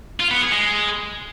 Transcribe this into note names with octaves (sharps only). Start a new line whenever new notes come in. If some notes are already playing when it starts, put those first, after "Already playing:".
F4
B3
G#4
G#3